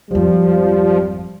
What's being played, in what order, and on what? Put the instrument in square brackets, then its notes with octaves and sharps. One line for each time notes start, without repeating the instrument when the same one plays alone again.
[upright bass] G#1 F2 [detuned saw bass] F3 [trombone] G3